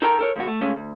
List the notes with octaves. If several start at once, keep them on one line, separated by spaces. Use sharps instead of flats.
D#4 A4 A#4 G5 A#5
A4 A#4 C#5
D#2 G#2 B2 F#4
A3
C#3 G#3 A3 C#4
D2